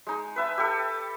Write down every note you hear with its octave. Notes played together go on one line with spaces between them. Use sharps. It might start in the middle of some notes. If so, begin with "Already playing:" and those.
G#3 D#4
B4 E5 A5
G4 A4